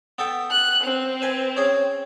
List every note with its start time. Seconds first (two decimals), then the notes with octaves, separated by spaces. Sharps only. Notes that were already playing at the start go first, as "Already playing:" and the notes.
0.18 B3 A4 G5
0.51 F#6
0.84 C4
1.22 B4 G#5
1.57 C#4 G#4